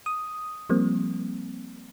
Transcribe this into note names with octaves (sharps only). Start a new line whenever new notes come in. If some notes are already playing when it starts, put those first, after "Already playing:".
D#6
F3 G3 A#3 C4